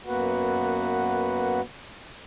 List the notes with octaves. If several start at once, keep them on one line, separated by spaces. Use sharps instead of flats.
F#2 A#3 B3 F#4 B4 F#5